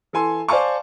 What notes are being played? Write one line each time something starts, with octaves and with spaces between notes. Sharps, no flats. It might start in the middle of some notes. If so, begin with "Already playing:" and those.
E3 A4 G#5 C6
C5 D5 F5 G#5 A5 C#6